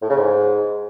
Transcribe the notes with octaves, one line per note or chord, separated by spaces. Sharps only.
A2
C#3
G#2